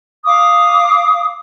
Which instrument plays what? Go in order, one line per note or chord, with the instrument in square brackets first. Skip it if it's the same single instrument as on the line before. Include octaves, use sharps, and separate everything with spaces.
[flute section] F5 D6 D#6